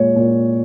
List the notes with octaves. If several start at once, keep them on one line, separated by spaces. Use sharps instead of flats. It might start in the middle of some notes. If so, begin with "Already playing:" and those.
Already playing: A#2 G#3 C#5
A#2